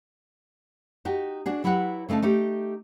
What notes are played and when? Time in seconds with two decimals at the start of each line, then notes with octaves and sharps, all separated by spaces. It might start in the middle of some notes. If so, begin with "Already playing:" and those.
1.05 D#4 F#4 G4
1.46 D4 F#4 G#4
1.64 F#3 E4 G4 B4 F#5
2.09 C#3 A3 D#4 F4 A5
2.22 A3 D#4 G4